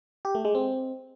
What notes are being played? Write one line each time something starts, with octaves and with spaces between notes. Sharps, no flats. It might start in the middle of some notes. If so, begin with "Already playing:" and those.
G4
A3
G#3
C4